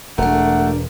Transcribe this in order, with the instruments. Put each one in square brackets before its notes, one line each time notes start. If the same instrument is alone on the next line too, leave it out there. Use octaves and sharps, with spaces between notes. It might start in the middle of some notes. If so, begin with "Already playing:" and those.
[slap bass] E1 E2 B2 [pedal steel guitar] A3 [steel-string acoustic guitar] D4 A#4 [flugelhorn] F#5